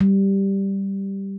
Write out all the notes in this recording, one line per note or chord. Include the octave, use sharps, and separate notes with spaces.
G3